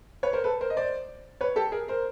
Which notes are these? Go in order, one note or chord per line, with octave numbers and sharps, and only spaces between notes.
B4 C#5
A#4 C5
A4 B4
A#4 C5
D#5
C5 D5
B4 C#5
G4 A4
G#4 A#4
A#4 C5